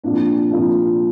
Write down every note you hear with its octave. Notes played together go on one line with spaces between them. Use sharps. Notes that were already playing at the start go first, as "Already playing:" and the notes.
C2 A#2 F3 D4
C2 A#2 F3